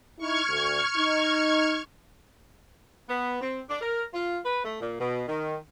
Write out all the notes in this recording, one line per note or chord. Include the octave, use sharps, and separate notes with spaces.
D#4 E4 C#6 F6 G#6
D2
D#4
B3
C4
D4
A#4
F4
B4
A3
A#2
B2
D#3